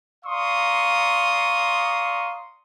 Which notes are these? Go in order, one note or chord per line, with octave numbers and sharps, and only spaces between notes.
D5 F5 A#5 C6 C#6 D#6